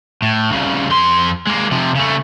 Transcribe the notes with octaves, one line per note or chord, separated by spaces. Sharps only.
A2
C2 C#3
F2 C6
G#3 A#3
C3 F3
C#3 A3